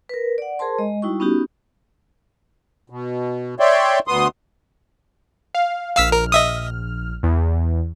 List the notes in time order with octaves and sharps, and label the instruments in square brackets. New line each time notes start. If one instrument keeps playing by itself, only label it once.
[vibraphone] A#4 B4
D5 F#5
G#4 A#4 C5 A5 C6
G#3 D#5
G3 D#4 E4 F#4 C#6
B3 C#4 D#4 F#4 G4
[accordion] B2
C#5 D5 E5 G5 C6
D2 B3 C6 D#6
[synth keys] F5
[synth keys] A#1 F6 [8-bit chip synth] F5 E6 B6
[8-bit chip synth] A#4
D#5 E5 D#6
[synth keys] E2